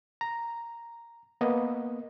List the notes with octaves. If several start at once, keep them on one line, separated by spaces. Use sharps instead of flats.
A#5
A#3 B3 D#5